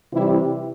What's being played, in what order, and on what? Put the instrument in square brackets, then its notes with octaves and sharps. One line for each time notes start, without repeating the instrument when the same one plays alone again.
[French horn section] C3 E3 G3 E4